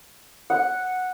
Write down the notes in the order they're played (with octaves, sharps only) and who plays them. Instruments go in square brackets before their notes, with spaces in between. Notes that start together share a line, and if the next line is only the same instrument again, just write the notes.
[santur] F#5